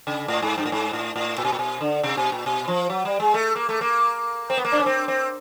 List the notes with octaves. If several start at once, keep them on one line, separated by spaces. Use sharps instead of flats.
C#3
A2
G#2
G2
A2
G#2
A2
A2
A#2
B2
A#2
B2
D3
C3
B2
A#2
B2
F3
F#3
G3
G#3
A3
A#3
A3
A#3
C4
B3
A#3
D4
C#4
C4
C4